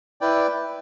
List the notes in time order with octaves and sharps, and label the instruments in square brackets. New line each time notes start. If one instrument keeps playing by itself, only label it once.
[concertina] E4 B4 D5 G5